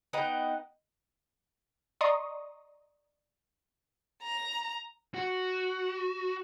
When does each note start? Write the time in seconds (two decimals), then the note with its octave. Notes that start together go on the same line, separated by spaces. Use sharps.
0.13 B3 D#4 F#5 G5
2.01 D5 D#5 A#5 C6 C#6 D#6
4.23 A#5
5.15 F#4